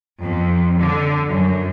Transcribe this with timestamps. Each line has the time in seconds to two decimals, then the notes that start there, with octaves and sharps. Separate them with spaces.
0.22 F2
0.80 D3
1.29 F#2